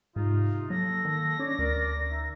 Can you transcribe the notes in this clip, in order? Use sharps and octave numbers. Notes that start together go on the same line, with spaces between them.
G#2 C3 D#4 F4
F#3 A#3 A4 A#6
D#3
C#4 D4 C#5 D5
D2 A#4 D5
D#4 E5